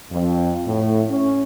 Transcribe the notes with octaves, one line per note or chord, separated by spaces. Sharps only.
F2
A2
C#4